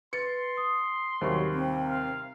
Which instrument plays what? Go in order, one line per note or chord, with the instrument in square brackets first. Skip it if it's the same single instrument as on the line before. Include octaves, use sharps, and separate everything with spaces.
[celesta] B4 A6 [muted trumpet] C6 [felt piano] C#7
[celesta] D#6
[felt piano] D#2 C3 G3 [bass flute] F#3 [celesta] C5 B5 C#6
[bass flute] C4
[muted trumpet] F5 [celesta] A#5